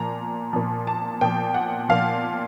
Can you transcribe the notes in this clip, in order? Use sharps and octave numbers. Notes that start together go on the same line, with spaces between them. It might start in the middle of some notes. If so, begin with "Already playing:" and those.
Already playing: A#2 F3 A#5
A#2 F3
A5
A#2 F3 G5
F#5
A#2 F3 F5